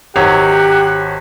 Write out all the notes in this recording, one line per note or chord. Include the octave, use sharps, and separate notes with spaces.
G#1 F#3 G4 C#5 F#5